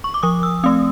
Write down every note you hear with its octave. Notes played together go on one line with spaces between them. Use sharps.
C#6
D6
F3 D#6
E6
A3 C4 D#6